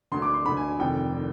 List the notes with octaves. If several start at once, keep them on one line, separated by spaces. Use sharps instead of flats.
D2 D3 C6
D6
C6
D2 D3 B5
G#5
G#5
F1 F2 D#3 G5
D#3